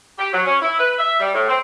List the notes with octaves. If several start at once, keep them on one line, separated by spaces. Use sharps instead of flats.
G4
F#3
C#4
E4
B4
E5
G3
A2
C4